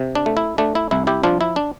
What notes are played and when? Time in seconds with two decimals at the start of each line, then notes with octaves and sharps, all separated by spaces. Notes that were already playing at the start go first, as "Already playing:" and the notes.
Already playing: C3
0.15 D4
0.26 A3
0.37 E4
0.58 A3 D4
0.75 E4
0.91 C2 E4
1.07 E4 G4
1.23 F3 D4 F4
1.41 E4
1.56 D4